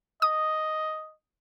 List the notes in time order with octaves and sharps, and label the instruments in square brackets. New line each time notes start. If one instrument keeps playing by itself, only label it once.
[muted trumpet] D#5 [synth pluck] D#6